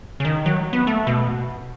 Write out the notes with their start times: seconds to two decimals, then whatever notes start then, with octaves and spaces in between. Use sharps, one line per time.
0.20 C#3
0.25 D#3
0.46 F#3
0.73 B3
0.87 A3
1.07 B2